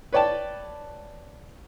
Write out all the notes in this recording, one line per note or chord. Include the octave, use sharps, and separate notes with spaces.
B4 C#5 D5 G5 A5